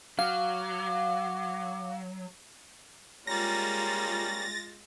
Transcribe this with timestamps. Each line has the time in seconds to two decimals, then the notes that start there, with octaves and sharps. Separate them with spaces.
0.19 F#3 F5 D6
3.27 G3 G#3 A#3 C#4 F4 A#5 A6 A#6